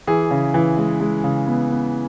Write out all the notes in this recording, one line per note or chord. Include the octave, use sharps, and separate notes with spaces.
E3 G#4
C#3
E3
G#3
G#3
C#3
B3
B3